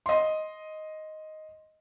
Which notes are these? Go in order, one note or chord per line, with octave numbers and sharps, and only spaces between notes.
D#5 C6